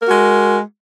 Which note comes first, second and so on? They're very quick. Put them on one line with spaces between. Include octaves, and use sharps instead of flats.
A#4 F#4 G#3